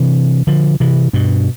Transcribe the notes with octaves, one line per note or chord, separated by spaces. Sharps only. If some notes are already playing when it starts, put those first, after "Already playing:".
Already playing: C3 E3
D3 F3
C3 E3
G2 B2